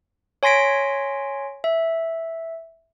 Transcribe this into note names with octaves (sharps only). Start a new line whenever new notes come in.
C#5 G#5 C6 A#6 B6 D7
E5